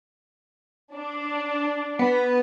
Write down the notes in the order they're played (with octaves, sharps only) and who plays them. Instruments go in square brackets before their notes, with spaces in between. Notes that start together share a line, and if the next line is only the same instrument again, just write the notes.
[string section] D4
[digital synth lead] B3